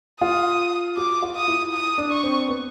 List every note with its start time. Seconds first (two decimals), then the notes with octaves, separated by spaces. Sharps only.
0.21 F4 D#6
0.97 F#4 D6
1.22 F4
1.36 D#6
1.48 E4
1.73 D#6
1.98 D4
2.11 C#6
2.23 C4
2.49 B3